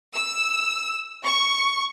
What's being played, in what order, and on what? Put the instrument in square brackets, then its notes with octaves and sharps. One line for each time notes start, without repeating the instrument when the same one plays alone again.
[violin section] E6
C#6